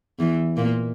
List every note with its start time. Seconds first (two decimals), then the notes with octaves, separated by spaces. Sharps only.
0.19 E2 E3
0.57 A#2 A#3